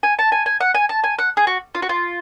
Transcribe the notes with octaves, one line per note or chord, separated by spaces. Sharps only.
G#5
A5
G#5
G#5
F#5
G#5
A5
G#5
F#5
G#4
F#4
F4
F#4
F4